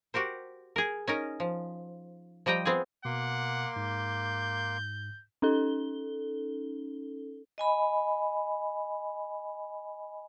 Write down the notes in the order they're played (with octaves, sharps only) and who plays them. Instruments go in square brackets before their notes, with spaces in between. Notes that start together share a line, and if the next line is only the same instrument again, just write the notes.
[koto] F#4 G4 A#4 C5
G#4 A#4
C#4 D#4 A#4
F3
F3 G3 D#5 G5 A#5
B3 C4 F4 G#4
[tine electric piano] B2 [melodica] A#3 C6 D6 [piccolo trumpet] F#5
[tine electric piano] G#2 [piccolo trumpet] G6
[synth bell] C#4 D#4 A4 G7
[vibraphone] D#5 G#5 B5